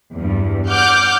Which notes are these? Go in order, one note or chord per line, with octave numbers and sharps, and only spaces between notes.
E2 G2
F#5 D6 F6 G6